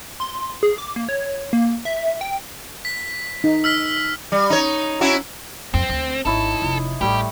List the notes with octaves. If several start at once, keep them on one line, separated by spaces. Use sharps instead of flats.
C6
G#4
D6
A#3
C#5
A#3
E5
G5
B6
D#4
E6 F6 B6
G3
D#4 C#5
C#4 E4 F#4
F2 C4
D2
G#1 D#4 E4 A4 C#5
F1 F4
A1 G3 A3 G4 E5